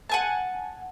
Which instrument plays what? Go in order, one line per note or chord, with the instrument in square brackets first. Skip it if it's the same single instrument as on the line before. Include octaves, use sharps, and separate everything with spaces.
[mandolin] F#5 G#5 A5